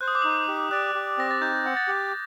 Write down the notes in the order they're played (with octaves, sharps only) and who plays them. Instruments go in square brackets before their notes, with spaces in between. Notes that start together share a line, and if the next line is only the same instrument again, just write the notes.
[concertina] C5 [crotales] F#6
[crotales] D#6
D6
[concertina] D#4 [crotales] D#6
[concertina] G4
[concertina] D5 [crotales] F#6
[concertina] G4
[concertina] C4 [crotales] A#6
[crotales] A6
[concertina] D#4 [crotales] G6
[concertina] F#5
[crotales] A6
[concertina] G4